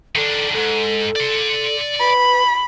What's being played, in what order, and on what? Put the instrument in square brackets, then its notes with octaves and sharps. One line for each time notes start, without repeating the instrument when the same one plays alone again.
[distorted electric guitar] D#3 D4 [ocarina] A4
[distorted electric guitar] D2 G#2 [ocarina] A4
[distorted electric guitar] D5 C6
[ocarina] B4 [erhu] B5